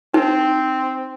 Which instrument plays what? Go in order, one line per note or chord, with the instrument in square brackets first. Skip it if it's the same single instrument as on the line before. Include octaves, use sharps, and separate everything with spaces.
[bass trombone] C4 [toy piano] D#4